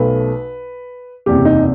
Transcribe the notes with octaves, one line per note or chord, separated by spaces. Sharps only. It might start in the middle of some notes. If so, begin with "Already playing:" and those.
Already playing: B1 B2 A3 B4
F#1 E2 C3 G4
D#4